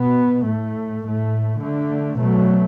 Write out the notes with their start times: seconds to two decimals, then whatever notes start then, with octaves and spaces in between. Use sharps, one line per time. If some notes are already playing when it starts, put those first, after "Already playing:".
Already playing: B2 B3
0.46 A2 A3
1.05 A2 A3
1.61 D3 A3
2.19 B2 F#3 A3